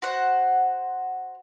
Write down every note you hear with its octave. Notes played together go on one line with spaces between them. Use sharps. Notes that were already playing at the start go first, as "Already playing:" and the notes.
F#4 C5 F#5